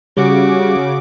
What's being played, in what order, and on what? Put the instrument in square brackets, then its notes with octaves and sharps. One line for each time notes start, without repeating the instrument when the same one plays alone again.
[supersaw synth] C#3 D6 [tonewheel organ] G3 [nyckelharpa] F#4